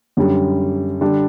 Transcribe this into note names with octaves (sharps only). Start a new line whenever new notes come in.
F#2 D3 G3
D3 G3 D4